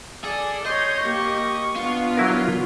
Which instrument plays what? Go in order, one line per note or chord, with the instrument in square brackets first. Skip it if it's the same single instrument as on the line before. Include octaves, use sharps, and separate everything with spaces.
[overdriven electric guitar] G#4 [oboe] A4 [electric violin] D5
[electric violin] C#5 G6 [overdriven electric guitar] D#5 [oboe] C6
[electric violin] A#3 G4 [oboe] C#6
[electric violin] B3 D4 [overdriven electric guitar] F4
[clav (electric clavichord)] F#3 E4 A#4